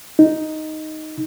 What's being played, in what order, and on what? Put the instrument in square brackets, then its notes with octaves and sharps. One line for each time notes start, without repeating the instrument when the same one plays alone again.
[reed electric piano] D#4